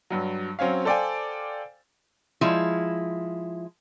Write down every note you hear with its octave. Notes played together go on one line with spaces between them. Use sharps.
G2 F#3
F#3 C4 C#4 C#5 F5
A4 C5 D5 F5 G5 G#5
F3 G#3 E4